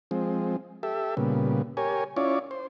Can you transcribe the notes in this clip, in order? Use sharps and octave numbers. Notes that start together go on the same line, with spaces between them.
F3 G#3 C4
G4 A4 E5
A#2 C#3 G3 B3
G4 A#4 C#5 G#5
C#4 E4 F4 C#5 D5
C5